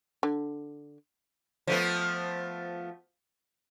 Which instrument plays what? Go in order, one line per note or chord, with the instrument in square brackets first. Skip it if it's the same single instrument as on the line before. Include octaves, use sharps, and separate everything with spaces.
[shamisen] D3
[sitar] F3 A3 B3